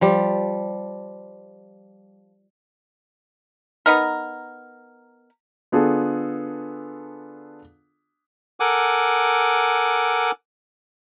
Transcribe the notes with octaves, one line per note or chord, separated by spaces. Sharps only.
F3 G3
B3 D#4 A#4
D3 B3 D4 F4 G#4 A4
A4 A#4 F#5 G#5 D6